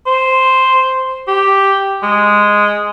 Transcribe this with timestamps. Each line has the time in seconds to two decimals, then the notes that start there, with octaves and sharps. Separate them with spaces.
0.07 C5
1.27 G4
2.03 G#3